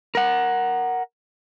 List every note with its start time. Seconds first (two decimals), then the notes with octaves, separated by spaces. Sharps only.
0.15 A#4 F#5